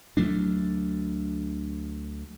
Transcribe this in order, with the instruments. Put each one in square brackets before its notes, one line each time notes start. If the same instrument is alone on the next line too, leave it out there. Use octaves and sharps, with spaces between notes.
[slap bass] D2 F#3 A3 D4